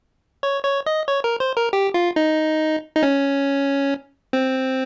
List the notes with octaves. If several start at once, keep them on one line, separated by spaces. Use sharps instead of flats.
C#5
C#5
D#5
C#5
A#4
C5
A#4
G4
F4
D#4
D#4
C#4
C4